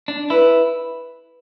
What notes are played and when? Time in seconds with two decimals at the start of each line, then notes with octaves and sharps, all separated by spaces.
0.08 D4
0.30 E4 B4